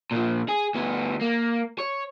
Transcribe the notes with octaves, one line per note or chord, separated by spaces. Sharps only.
A#2 F3
G#4
D2 B3
A#3
C#5